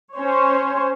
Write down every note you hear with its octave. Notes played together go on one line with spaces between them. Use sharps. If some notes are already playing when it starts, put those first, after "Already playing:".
C#4 C5 C#5